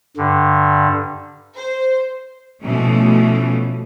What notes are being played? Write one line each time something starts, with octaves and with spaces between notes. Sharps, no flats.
G2 D3
C5
B2 E3 F3 A3 C#4